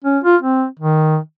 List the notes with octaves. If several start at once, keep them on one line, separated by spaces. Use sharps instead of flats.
C#4
F4
C4
D#3